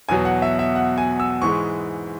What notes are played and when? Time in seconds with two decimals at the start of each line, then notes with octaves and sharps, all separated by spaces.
0.09 E2 B2 F#3 G#5
0.25 F#5
0.42 E5
0.59 E5
0.75 F#5
0.98 G#5
1.20 E6
1.42 G#2 E3 G#3 C#6